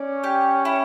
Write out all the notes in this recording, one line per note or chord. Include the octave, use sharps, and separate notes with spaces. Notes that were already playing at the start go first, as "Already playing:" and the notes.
Already playing: C#4 D5
G4
E4